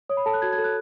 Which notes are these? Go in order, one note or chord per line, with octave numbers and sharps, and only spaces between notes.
C#5 D#6
B5
A4 A5
F#6
F#4 G#6
G#6
A4
F#6